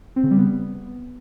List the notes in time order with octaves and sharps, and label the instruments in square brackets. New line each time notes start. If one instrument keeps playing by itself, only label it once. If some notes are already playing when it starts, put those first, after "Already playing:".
[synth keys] C4
C#3
G3
B3